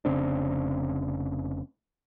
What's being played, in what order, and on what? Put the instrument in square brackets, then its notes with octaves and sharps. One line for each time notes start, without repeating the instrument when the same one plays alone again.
[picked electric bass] F1 C#3 C4 D4